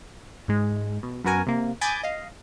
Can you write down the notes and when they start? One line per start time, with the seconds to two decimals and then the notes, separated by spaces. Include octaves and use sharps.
0.48 G#2 G#3
1.03 B2
1.24 F#2 B3 F#4 A#4 G#5
1.47 C3 A#3
1.81 G#5 B5 D6 D#6 G6 A6
2.03 D#5 F5